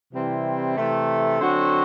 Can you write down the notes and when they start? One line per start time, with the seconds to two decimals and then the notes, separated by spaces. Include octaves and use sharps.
0.13 C3 E3 G3 C4 E4
0.77 C3 E3 A3
1.41 D3 F#3 C4 F#4